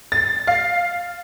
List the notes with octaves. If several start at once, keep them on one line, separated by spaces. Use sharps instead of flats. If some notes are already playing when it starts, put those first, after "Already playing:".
A6
F5